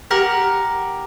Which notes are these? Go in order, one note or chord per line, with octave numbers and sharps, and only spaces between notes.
G4 A#4 F#5